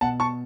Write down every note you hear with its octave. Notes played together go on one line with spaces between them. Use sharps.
B2 F#5 A5
A5 C#6